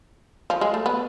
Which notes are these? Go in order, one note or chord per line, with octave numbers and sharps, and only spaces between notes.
F3
G#3
A3
B3